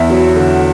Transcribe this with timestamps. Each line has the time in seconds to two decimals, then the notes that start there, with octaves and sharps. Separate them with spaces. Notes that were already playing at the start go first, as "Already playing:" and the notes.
Already playing: E2 E5
0.10 F#3
0.36 D3